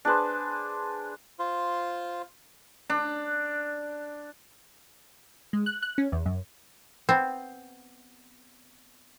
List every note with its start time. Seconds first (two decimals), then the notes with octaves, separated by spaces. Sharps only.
0.05 D4 G#4 B4 C5
1.39 F4 C5
2.90 D4
5.53 G#3
5.66 F#6
5.82 F#6
5.98 C#4
6.12 E2
6.26 F#2
7.09 B3 C4